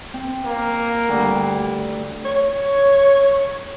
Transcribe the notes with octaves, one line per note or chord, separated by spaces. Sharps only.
C4
A#3
D2 G2
C#5